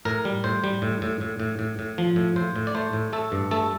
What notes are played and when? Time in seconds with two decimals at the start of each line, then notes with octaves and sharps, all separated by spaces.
0.05 A2 A#4
0.25 G3
0.44 A2 C5
0.64 G3
0.82 A2
1.02 A2
1.21 A2
1.40 A2
1.59 A2
1.79 A2
1.98 F3
2.16 A2
2.36 A2 C5
2.56 A2
2.67 D5
2.75 A3 C5
2.93 A2
3.13 A3 A4
3.32 G2
3.51 A3 A4